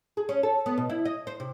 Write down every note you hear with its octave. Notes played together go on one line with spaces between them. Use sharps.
G#4
C#4
A4
B3
B2
E4
D#5
C5
C3